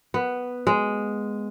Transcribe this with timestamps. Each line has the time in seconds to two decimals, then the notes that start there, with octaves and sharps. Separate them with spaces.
0.14 B3
0.67 G#3